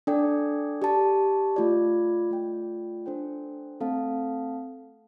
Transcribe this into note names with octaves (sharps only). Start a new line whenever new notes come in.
D4 A4 D5 G5
G4 D5 A5
A3 F4 D5
A3 F4 D5 G5
D4 A4 C5 G5
A3 C4 A4 F5 A5